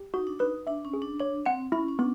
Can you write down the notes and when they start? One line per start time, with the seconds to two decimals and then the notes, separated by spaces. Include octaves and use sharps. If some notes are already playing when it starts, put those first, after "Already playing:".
Already playing: G4
0.14 D#4 F#4
0.27 D4
0.39 D#4 B4
0.67 D4 E5
0.85 C#4
0.93 G#4
1.02 D4
1.20 D4 C#5
1.46 C4 F#5
1.72 C#4 E4
1.88 C#4
1.99 B3 D4